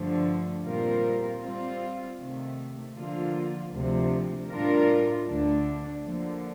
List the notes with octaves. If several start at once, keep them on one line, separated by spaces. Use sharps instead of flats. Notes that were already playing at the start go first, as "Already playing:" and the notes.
Already playing: G2 D3 F3 A3
A#2 G3 C4 F4 A#4
G3 C4 F4
C3 D#3 A3
D3 F3 A#3 F4
D2 C3 F3
A2 G3 D4 F4 A#4
D2 D3 A3 D4
D3 F3 A#3